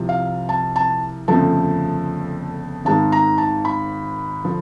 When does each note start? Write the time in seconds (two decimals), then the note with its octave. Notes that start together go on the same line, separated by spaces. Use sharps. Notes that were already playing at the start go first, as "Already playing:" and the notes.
Already playing: C2 C3 F3
0.09 F5
0.49 A5
0.76 A5
1.28 G1 F2 C#3 F3 A3 A5
2.85 G#1 G#2 D#3 G#3 A5
3.12 A#5
3.38 A5
3.65 B5
4.44 D3 F3